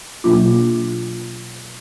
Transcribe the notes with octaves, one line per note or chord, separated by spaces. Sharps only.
B2 F#3 A#3 D4 F4